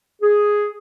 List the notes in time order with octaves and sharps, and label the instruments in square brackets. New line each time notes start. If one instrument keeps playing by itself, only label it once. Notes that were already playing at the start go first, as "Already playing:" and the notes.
[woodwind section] G#4